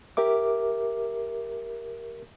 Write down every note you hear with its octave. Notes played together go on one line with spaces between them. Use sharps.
G4 A#4 E5 D6